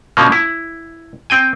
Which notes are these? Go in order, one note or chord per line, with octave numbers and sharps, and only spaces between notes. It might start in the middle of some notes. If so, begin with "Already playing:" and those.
B2 D3 F3 A#3 C#4
E4
C4 G5 G#5